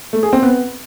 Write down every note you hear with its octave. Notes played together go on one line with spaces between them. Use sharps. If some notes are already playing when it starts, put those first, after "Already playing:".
A3
G#4
C4
B3